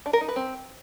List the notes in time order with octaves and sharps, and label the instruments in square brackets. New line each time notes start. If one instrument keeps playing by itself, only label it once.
[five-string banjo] D4
A#4
D#4
B4
C4